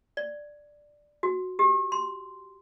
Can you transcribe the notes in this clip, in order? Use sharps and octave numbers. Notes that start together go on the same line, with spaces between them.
D5
F#4
G4
C6